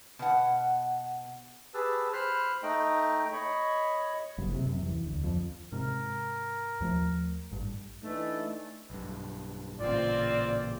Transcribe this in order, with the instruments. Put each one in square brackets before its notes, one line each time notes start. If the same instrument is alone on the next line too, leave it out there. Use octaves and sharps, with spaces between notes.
[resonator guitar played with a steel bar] B2 F#5
[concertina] G4 G#4 B4 A5 E6
C5 B5 C6 F6 F#6
A3 D#4 D#5 G5
C#5 D#5 B5 C#6
[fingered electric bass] F#1
C3
F#2
E2
D2
F2
[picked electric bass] G#2 C3 [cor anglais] A#4
[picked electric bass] D#2 F3 A3
A1 G2
[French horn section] E3 D4 D#4 [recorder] A3
[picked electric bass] B1 G2
[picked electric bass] A1 A#2 C#3 [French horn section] C4 F4 [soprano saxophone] D5